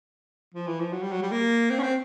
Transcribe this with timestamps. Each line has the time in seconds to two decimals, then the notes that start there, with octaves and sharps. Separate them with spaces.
0.54 F3
0.67 E3
0.80 F3
0.93 F#3
1.03 G3
1.12 F#3
1.22 G3
1.32 A#3
1.70 C4
1.79 C#4
1.83 C4